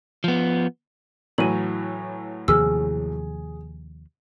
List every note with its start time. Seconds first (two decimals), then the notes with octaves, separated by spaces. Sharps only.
0.24 F3 B3
1.38 A2 E3 F#3 D#7 F#7
2.48 D#2 C3 F3 G#4 E6 F6